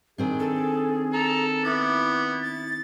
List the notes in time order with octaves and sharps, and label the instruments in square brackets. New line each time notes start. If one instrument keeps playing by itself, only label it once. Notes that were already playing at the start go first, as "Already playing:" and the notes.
[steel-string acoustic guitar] D#3 C4 D4 [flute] G#4
[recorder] A4
[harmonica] A4 [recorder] A#5
[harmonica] B3 [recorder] E4 [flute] D6
[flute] A6